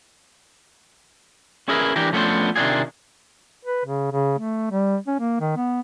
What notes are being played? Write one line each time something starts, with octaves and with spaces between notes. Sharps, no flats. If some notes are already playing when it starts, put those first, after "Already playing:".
C#4 E4 G#4 A#4 B4
E3 D4 G4 A#4
F3 A3 B3 C#4 D4 C5
C3 D#3 E3 D4 F4 G#4
B4
C#3
C#3
A3
G3
C#4
A#3
D#3
B3